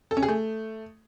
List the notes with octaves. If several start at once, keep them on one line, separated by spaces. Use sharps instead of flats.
A4
C#4
G#4
A3